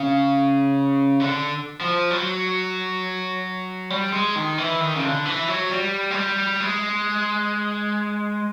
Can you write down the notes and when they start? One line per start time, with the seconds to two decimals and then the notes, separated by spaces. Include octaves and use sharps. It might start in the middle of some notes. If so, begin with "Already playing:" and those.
Already playing: C#3
1.21 D3
1.81 F3
2.11 F#3
3.90 G3
4.13 G#3
4.36 D#3
4.58 E3
4.81 D#3
4.95 C#3
5.03 D3
5.25 E3
5.48 F#3
5.70 G3
6.11 G#3
6.15 G3
6.60 G#3